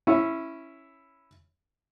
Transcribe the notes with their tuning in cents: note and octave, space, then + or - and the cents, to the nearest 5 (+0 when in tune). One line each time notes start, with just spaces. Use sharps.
C#4 -10 E4 +0